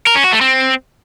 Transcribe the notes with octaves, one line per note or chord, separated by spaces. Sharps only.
A#4
C#4
F#4
A3
C4